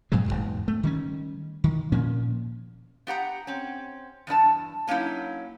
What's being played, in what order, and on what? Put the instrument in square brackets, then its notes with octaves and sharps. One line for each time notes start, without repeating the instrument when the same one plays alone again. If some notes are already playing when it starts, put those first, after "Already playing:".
[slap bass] G2 A#2 F#3 G#3
E1 F2 G#2 B2
A3
D#3 G3 C#4
D#3
A#2 F3 A#3 C#4
[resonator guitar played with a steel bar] B3 G4 F#5 A#5
C4 C#4
E2 G2 D#4 A5
F#3 A#3 C#4 D#4 E4